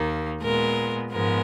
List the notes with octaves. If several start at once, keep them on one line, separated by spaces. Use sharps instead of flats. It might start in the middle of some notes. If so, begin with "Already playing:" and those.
Already playing: D#2 D#3 A#3
A#2 G#3 B3 A#4
G#2 F3 G#3 B3 A#4